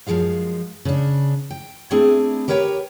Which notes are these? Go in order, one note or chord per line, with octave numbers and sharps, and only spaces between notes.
F#2 E3 F3 G#3 F5
C#3 D4
G5
A3 C4 D4 E4 G#4
G4 A#4 B4 C#5 F5 G5